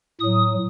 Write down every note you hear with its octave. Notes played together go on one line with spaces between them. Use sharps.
A2 F#3 D#6